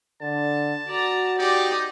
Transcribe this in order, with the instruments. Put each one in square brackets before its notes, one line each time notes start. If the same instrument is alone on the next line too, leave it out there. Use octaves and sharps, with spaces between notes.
[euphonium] D3 [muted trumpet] A5
[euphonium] F#4 [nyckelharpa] D5 A#5
[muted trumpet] D#4 [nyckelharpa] G4 D5